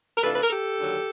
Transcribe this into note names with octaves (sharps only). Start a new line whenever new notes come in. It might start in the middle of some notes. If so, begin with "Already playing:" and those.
A#4
C3 E3 A3 D4 F4 A4 B4
B4
A#4
G4 A4
D#2 D3 F#3